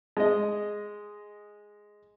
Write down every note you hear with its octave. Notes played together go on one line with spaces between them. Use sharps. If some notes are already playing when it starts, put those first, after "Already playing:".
G#3 D#5